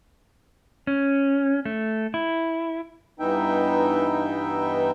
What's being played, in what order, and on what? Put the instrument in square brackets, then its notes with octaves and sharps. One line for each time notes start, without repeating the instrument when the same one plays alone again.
[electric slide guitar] C#4
A3
E4
[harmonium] G2 E3 B3 D#4 E5 G5